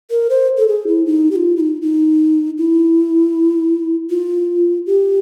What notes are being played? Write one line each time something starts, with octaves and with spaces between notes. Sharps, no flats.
A#4
C5
A4
G#4
E4
D#4
G4
F4
E4
D#4
D#4
E4
F4
G4